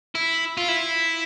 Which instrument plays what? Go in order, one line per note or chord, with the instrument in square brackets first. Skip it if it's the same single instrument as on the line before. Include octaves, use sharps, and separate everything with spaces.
[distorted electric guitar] E4
F4
E4